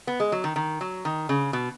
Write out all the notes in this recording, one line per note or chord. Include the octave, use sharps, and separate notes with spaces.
B3
G#3
F#3
D#3
D#3
F#3
D#3
C#3
B2